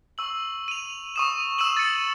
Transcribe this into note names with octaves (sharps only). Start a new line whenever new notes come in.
C#6 E6 F#7
D#7 F7
C#6 D#6 E7
E6 D#7 E7 F#7
A6 C#7